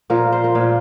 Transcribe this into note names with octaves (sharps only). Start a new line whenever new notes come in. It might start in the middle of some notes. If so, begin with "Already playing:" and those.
A#2 F3 A#4
C5
A#4
A#2 F3